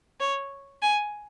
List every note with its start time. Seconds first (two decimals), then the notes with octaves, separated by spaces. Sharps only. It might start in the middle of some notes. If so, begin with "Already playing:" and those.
0.20 C#5
0.82 G#5